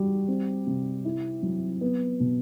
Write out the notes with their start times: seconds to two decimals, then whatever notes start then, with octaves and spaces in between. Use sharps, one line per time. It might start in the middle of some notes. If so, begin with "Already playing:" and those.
Already playing: G3 F#4
0.28 C4
0.67 C3
1.05 E4
1.43 F#3
1.81 B3
2.20 B2